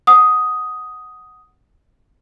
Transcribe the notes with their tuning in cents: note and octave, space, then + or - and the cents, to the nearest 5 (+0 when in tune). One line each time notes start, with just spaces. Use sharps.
F#5 +0 D#6 +5